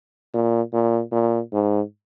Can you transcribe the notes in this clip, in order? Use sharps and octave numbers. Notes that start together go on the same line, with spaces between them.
A#2
A#2
A#2
G#2